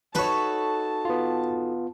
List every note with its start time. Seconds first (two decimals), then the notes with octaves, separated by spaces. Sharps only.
0.15 D#4 F#4 A4 B4 C#5 A5
1.05 B3 F4